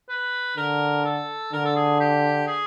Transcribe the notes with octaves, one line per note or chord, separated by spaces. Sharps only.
B4
D3 A#4
A4
D3 A#4
A4
G#4
G4
G#4